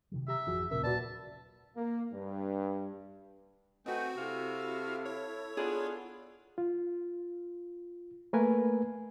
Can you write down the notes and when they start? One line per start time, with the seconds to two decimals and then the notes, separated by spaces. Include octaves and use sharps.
0.12 C3 D#3 F#3
0.28 G4 E5 A#5
0.47 G#1 F2 E3 F#4 G#4
0.71 D#1 B1 A#2 C#3 A#4 E5
0.84 F#4 B4 D5 A5
1.76 A#3
2.12 G2
3.86 A3 C4 D#4 F#4 B4 F#5 G#5 G6
4.17 C3 E4 F#4 A4 F5
5.06 C#5
5.57 B3 D4 F4 G#4
6.58 F4
8.33 A3 A#3 A#4 B4 G#5